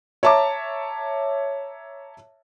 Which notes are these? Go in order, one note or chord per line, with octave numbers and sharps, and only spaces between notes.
C#5 E5 A5 A#5 D6